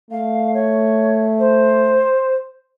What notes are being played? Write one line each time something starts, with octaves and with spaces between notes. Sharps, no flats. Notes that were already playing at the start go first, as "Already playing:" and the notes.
A3 F5
C#5
C5